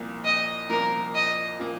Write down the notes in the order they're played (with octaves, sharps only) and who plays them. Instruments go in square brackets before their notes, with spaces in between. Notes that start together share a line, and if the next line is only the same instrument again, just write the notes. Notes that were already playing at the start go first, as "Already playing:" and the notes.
Already playing: [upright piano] C2 A#2 F3 A#3
[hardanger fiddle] D#5
[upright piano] C2 A#2 F3 A#3 [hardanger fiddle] A#4
[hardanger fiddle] D#5
[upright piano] A#2 F3 A#3